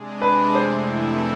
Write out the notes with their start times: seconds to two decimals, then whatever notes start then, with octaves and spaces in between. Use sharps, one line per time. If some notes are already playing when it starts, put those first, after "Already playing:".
Already playing: C3 G#3 D4 G#4
0.22 B4
0.55 F2 C3 E3 A3 E4 C5